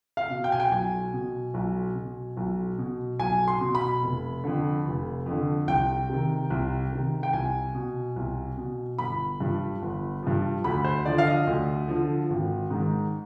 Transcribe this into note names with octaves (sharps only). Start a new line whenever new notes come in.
F5
B2
G5
G#5
G5
B1 G#5
B2
B1
B2
B1
B2
B1 G#5
C6
B2
B5
F1
F2 D3
F1
F2
D3
C2 G5
C3 D#3
C2
C3 D#3
G5
C2 G#5
B2
C2
B2
G1 B5
G2 F3
G1
G2 F3
D2 B5
C5
D3 F3 D5
F5
D#5
D2
D3 F3
G#1
G#2 D#3